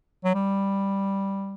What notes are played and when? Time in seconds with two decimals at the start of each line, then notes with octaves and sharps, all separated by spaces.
0.24 F#3
0.34 G3